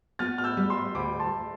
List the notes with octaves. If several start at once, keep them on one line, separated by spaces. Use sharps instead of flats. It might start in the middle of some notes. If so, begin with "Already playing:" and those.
B3 F6 A6
F6
E6 G6
G3
C6 E6
D2 B5 D6
A5 C6